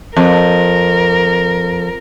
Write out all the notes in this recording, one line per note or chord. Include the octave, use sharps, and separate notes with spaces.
F2 A#4